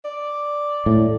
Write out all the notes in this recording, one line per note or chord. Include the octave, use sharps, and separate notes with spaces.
D5
A2